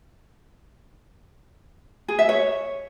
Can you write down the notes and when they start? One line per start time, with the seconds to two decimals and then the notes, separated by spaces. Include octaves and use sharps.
2.08 G#4
2.19 E5
2.29 C#5